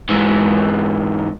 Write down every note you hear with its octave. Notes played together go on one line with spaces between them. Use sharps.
G#2 E3